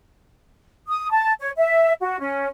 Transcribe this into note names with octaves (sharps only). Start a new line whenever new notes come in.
D#6
A5
C#5
E5
F#4
C#4